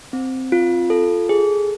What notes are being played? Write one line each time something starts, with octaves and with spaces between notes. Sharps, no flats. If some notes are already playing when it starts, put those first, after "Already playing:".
C4
F4
A4
G#4